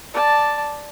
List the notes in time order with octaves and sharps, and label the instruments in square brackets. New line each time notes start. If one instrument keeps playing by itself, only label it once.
[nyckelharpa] D5 A5